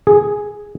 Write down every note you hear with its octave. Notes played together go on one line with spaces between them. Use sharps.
G#4